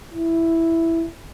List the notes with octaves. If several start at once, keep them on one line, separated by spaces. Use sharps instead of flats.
E4